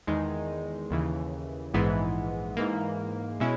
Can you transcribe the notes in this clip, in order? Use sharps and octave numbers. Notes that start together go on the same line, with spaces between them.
E2 D#3 G#3 D#4
D#2 C#3 E3
A#1 G#2 E3 G#3 B3
G#2 E3 A#3
B2 G#3 C#4 E4